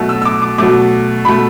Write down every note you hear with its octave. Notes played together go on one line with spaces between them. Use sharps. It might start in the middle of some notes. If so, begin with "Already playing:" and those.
Already playing: B2 F#3 A3
E6
E6
D6
D6
B2 F#3 A3 D6
B2 A3 B5